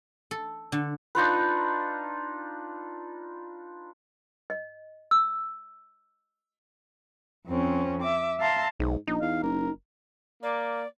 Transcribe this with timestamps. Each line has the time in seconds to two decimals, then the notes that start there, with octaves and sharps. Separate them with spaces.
0.31 A4
0.72 D3
1.15 D4 D#4 F4 B4
4.50 D#5
5.11 E6
7.47 F2 C4 C#4
8.02 E5 D6
8.39 E5 F5 A5 A#5 C6
8.80 B1 G#2
9.07 A#1 D#4
9.22 E2 F5
9.43 F#1 A#4
10.43 A#3 D5